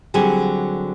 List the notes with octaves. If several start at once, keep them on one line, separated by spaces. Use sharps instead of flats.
D3 F#3 G3 C4 G#4